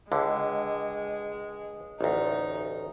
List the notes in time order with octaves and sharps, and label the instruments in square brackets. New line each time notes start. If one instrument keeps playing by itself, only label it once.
[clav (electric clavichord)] C#2 D3 [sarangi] G#3
[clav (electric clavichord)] A1 D2 [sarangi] D#4